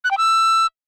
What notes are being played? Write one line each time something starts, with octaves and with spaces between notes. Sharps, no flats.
F#6
G5
E6